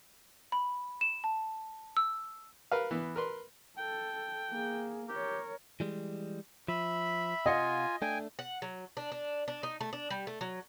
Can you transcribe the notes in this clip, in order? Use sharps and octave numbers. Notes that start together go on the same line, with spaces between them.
B5
E7
A5
E6
A#4 B4 F5
E3 B3
A#4 B4 C6
A4 G5
A#3 G#4
G4 A#4 C#5
E3 G3 G#3
F3 E5 B5
C3 F4 D#5 F5 F#5 G#5
A3 D4 G5 G#5
F#5
F#3
D4
D4
D4
D#4
A3
D4
G3
A3
F#3